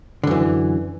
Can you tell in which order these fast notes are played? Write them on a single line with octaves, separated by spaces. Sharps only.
D3 F#2 E3